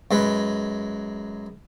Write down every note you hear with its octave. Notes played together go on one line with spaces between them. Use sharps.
F#2 G#3 B4